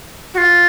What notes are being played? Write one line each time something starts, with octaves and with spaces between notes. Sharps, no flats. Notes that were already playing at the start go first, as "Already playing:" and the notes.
F#4
F4